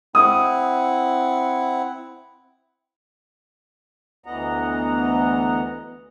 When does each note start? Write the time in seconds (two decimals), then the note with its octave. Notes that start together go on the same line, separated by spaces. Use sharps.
0.15 C4 E4 F#5 D#6
4.26 D2 E3 B3 D#5 F#5 A#5